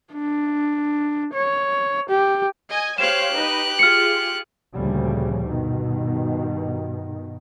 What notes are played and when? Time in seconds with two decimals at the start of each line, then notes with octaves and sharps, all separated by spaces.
0.13 D4
1.34 C#5
2.09 G4
2.70 D#5 G#5
2.98 G4 C5 C#5 F5 F#6 E7
3.32 D#4 B4
3.79 F4 G#4 F6 C#7
4.74 D2 A#2 C#3 F3 G3
5.47 G2 B2 D#3